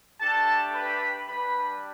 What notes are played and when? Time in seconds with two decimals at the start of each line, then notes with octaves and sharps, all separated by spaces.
0.20 A3 D4 G4 A4 A5
0.74 B4 B5
1.28 G3 D4 G4 B4 B5